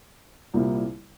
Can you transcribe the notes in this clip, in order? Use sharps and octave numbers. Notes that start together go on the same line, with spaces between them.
C2 A#2 G3 A#3 E4